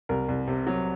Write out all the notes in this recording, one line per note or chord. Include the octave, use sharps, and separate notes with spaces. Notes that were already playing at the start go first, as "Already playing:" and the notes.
C2 A#4
C2
C3
F#3